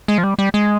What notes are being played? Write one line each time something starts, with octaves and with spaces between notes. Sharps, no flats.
G#3
F3
G3
G3
G#3